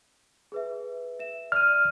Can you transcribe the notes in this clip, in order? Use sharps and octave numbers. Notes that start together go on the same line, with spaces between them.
G#4 B4 E5
E5 E7
D5 F6 D#7